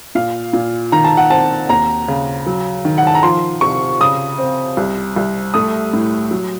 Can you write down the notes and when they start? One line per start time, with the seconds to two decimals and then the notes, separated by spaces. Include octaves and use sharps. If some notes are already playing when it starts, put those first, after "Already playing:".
0.15 A#2 F5
0.53 A#2
0.92 D#3 A#5
1.04 A5
1.17 F#5
1.30 C4 A5
1.69 D#2 A#5
2.08 C#3
2.46 F#3
2.85 D#3
2.98 F#5
3.07 A5
3.15 A#5
3.23 F3 C6
3.61 C3 C#6
4.00 C#3 D#6
4.38 C4
4.77 C2
5.16 C2
5.54 A3 D#6
5.93 A2
6.31 F#3